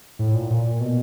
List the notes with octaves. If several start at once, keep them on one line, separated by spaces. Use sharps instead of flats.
A2
A#2
A#2
B2